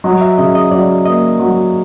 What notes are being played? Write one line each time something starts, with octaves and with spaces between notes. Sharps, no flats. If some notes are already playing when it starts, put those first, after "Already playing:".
F#3 D#5
E5
C#3 D#5
D#5
F#3 D5
A#3 D#5
F#3